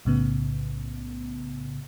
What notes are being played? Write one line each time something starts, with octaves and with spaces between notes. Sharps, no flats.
B1 A2 C#3 B3